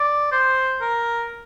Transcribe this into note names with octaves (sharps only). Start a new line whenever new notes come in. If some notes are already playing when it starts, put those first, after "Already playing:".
Already playing: D5
C5
A#4